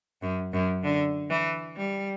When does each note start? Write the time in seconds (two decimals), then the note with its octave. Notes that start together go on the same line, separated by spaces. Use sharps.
0.22 F#2
0.53 F#2
0.84 D3
1.30 E3
1.77 G3